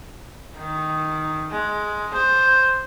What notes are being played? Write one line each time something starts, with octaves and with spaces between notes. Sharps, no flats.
D#3
G#3
C5